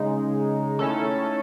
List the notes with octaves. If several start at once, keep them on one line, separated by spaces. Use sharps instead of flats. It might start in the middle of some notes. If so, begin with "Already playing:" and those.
Already playing: C#3 G#3 D#4
D#3 A3 C#4 E4 A4